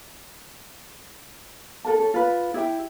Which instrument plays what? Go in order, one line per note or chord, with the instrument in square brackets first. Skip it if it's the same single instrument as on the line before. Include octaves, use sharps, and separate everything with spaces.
[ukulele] A4 A#4 A5
C#4 A4
F4 B4
E4 G4 E5 G5